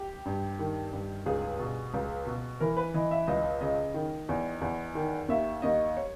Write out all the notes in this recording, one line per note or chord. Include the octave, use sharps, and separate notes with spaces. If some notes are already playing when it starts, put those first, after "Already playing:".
Already playing: G4
G2
D#3
G2
C#2 G#4
B2
C#2
B2
E3 A#4
B4
E3 D#5
E5
C#2 D#5
C#3 D#5
D#3
E2
E2
D#3
D#2 E5
D#2 D#5
C#5